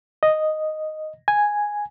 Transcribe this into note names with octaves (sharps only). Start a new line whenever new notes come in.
D#5
G#5